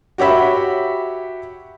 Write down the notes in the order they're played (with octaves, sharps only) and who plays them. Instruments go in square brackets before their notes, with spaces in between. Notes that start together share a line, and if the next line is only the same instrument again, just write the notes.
[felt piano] F#4 G4 C#5 E5 B5